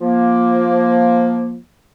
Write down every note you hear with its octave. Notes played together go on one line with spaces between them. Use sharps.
F3 A#3